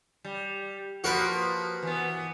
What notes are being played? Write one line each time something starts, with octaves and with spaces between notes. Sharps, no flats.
G3
F3 A#3 F#4 A#4 B4
E3 B3